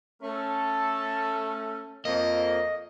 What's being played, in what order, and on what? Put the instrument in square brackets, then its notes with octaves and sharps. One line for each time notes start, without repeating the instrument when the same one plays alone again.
[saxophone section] A3 C#4 [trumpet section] A4
[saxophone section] F2 A#3 [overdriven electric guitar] D#5